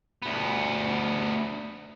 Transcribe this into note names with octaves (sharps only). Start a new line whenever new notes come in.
D2 B3